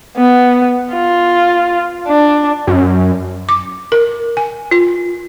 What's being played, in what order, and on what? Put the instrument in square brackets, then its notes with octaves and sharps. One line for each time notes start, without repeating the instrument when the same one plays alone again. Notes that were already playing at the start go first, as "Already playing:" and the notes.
[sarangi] B3
F4
D4
[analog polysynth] F#2
[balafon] D6
A#4
G#5
F4